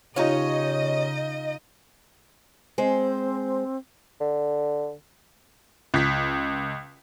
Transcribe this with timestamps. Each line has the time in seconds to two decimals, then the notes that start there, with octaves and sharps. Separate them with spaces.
0.16 D#2 C#3 C#4 D#4 F4 C#5 D#5
2.78 G#3 C4 C5
4.20 D3
5.94 C#2 B6